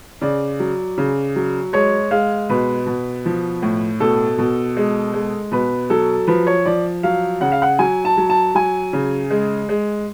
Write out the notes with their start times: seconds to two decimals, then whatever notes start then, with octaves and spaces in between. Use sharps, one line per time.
0.21 C#3 D5
0.60 F#3
0.98 C#3
1.36 F#3
1.73 G#3 C#5
2.11 G#3 F5
2.49 B2 B4
2.86 B2
3.25 F3
3.62 A2
4.00 B2 A4
4.38 B2
4.77 G#3
5.14 G#3
5.52 B2 B4
5.90 F#3 A4
6.27 F3 B4
6.47 C#5
6.66 F3 D5
7.03 F#3 F5
7.41 C#3 F#5
7.52 F5
7.62 F#5
7.79 F#3 G#5
8.05 A5
8.17 F#3
8.30 A5
8.55 F#3 G#5
8.93 C#3
9.31 G#3
9.69 G#3